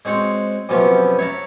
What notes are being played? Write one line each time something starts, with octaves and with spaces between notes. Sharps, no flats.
G#3 C4 F#4 C#5
F#2 C3 F3 B3 C#4
C#5 E5 F#5 A5 A#5